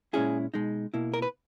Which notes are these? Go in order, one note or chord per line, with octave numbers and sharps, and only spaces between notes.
A#2 G#3 C#4 E4 G#4
B2 G#3 D#4
B2 A#3 E4
A#4
B4